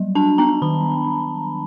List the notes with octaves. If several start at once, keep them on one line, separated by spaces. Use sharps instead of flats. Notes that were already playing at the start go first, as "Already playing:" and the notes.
Already playing: F#3 G3
D4 A5
B3 A#5
D#3 B5